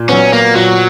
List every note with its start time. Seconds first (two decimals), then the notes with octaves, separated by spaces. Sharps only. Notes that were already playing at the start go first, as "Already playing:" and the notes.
Already playing: A#2
0.09 F#3 B3 C#4
0.33 A#3
0.55 A#2 F#3